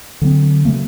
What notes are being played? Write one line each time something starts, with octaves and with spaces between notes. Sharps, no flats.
D3 F#3 A#3 C4
C#3 F#3 A3 A#3